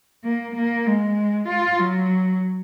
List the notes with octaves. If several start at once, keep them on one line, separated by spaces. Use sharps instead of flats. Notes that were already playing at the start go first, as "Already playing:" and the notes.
A#3
A#3
G#3
F4
F#3